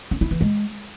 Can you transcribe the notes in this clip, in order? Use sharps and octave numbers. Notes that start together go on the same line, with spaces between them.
C#4
E4
E3
G#3